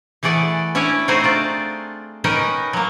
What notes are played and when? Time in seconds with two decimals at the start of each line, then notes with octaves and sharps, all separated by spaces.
0.23 E3 A3 G#4 D5 F#5
0.75 C#4 D4 E4 C#5 D5 G#5
1.08 A3 C4 D#4 F#4 G#4 C5
1.23 D4 F4 D5
2.24 C#4 D#4 A#4 B4 D#5 G5
2.73 F#3 A#3